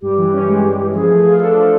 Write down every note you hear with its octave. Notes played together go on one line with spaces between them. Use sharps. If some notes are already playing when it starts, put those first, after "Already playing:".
G2 G4
E3
C#4
G#3
G2
E3
F3 G#4
A3
F4
D4 A4
F3